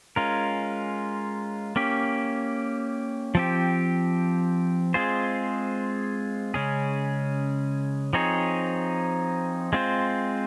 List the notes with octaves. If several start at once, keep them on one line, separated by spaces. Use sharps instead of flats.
G#3 C#4 F4 A#4
A#3 C#4 G4
F3 C4 G4
G#3 C4 F4 G#4 C5
C#3 G#3 C#4 G#4
F3 C4 D#4 G#4 C#5
G#3 C4 F4 C5